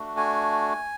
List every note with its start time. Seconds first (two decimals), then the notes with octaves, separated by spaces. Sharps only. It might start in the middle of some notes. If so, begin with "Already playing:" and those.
Already playing: A3 D4 F#4
0.17 G#5